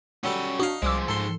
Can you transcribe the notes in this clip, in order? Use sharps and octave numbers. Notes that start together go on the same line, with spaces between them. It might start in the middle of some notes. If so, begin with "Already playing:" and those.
F#3 G3 C#4 A4 B5
D4 D#4 F#4 F5
C2 F3 G#3 D6 E6
G#2 A4 C6